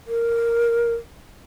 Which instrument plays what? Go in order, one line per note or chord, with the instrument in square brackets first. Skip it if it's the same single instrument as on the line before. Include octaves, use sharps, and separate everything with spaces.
[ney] A#4